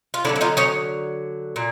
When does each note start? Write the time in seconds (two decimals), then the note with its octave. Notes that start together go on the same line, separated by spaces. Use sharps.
0.14 F4
0.24 D3 F#3 A3 D4 E4
0.36 E4
0.41 D#4 F4
0.57 C#4 D#4
1.56 A#2